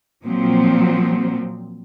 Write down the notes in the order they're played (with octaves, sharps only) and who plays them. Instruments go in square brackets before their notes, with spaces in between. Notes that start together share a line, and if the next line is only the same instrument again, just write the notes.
[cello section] A#2 F3 F#3 C4